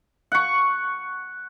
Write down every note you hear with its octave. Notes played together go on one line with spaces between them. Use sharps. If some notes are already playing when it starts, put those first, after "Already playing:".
F#5 C#6